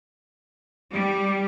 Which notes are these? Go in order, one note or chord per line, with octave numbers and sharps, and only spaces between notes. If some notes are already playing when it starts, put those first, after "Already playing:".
G3